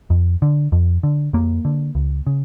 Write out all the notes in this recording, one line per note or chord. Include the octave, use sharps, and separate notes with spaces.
F2
D3
F2
D3
F2 A#3
D3
C#2
C#3